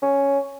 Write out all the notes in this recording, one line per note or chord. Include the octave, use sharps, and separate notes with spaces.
C#4